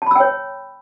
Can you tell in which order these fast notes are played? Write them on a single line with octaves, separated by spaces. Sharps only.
A5 B5 E6 G5 C#5